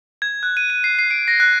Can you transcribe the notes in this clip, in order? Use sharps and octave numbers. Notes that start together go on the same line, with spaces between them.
G#6
F#6
D#7
D#7
C7
C7
D7
A#6
F#6